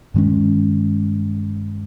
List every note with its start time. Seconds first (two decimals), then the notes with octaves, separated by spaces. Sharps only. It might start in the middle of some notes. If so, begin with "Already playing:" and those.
0.14 G2 D#3 G#3 C#4